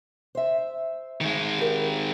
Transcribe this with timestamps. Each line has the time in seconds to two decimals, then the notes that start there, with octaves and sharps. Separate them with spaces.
0.35 C5 E5
1.21 D#3 G#3
1.58 G4 A#4